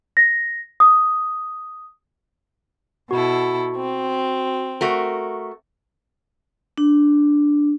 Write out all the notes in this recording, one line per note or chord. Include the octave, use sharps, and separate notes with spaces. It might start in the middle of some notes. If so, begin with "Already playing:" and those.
A#6
D#6
B2 E4 F#4 A4
C4
A3 F#4 A#4
D4